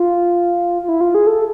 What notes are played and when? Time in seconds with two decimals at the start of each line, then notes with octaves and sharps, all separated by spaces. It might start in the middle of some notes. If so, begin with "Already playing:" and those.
Already playing: F4
0.83 F4
0.89 E4
1.01 F4
1.15 G#4
1.27 A4